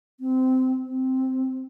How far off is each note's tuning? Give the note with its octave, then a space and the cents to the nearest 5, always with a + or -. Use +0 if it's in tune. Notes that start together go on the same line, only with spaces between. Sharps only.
C4 -20
C4 -5